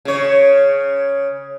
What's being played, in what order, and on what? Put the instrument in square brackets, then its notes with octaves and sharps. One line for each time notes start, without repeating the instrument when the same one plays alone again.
[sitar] C#3 C#5